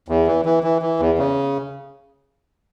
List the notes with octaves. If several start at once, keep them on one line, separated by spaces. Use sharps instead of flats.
E2
E3
E3
E3
E3
E2
C#3